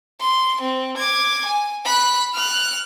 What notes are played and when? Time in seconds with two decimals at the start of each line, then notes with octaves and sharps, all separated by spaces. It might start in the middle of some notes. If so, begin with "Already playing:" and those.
0.20 C6
0.61 C4
0.97 D6 G#6
1.46 G#5
1.85 B5 F#6
2.34 F6 F#6